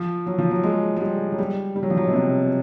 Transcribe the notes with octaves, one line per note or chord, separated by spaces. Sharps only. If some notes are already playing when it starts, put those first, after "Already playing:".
Already playing: F3
F#3
F3
F#3
G#3
G#3
G3
F#3
G3
G3
F#3
F3
F#3
B2
C3